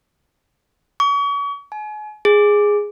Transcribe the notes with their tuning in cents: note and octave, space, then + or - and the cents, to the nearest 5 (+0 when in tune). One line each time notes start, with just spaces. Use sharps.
C#6 +40
G#5 +35
G#4 -5